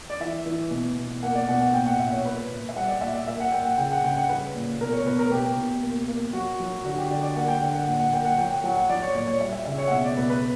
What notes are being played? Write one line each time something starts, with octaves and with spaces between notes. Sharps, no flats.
D5
E3 E5
E3
B2
B2
A#3 F#5
D5
B2 F#5
F#5
A#2 G5
F#5
A#2 E5
C#5
A#3 B4
A#2
E5
G3 F#5
D5
A#2 E5
D5
A#3 E5
F#5
A#3 G5
F#5
C#3 G5
F#5
C#3 G5
F#5
G3 B4
A#2
B2 A#4
C#5
B2 B4
A#4
B2 G4
B2
A#3
A#3
F#3 F#4
F#3
D3 F#4
G4
D3 D5
D5
A#3 F#5
G5
D3
F#5
A#2 F#5
F#5
A#3 G5
F#5
F#3 G5
G5
F#3 F#5
F#5
F#3 D5
C#5
A#2 D5
C#5
G3 E5
E5
C#3 E5
C#5
F#5
B2 E5
D5
B2 B4
B4